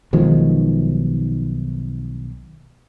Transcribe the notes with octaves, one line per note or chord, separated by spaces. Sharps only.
B1 D#3 F3 G#3